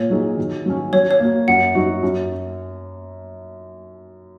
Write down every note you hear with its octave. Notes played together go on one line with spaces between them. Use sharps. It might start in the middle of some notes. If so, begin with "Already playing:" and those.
Already playing: A#2 C#5
F#3 D#4 G#4
D#3
F#3 C#4
F#3 C#5
C#5
A#3 F#4
F#2 F#5
F#3 D#4 F#4
F#2